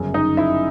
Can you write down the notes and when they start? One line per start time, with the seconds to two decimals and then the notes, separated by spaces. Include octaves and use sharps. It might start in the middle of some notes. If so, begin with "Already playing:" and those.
Already playing: G1 F#2 C#3
0.14 D#4 D#5
0.37 E4 E5